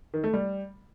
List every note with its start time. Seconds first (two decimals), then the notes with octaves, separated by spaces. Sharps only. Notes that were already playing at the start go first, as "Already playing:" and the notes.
0.14 D#3
0.24 A3
0.34 G3